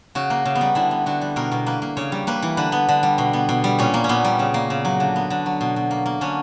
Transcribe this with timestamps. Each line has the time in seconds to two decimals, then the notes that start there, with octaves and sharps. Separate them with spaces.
0.15 C#3 F#4
0.30 A#3
0.45 C#3
0.55 B3
0.61 G3
0.75 D3 E4
0.91 B3
1.06 D3 F#4
1.21 G3
1.36 B2 A#4
1.52 B2
1.66 A#3 B4
1.82 A#3
1.97 C#3 C#5
2.12 G3
2.27 A#3 B4
2.42 E3
2.57 D3 B4
2.72 B3
2.89 D3
3.03 G3
3.18 B2
3.33 B3
3.49 B2
3.64 G3
3.79 A#2 C#4
3.94 A#3
4.04 C#4
4.09 A#2 B3
4.24 G3
4.39 C#3
4.54 A#3
4.70 C#3
4.85 F#3
5.00 D3
5.16 B3
5.30 D3
5.46 F#3
5.61 B2
5.76 B2
5.91 A#3
6.06 A#3
6.21 D3 C#4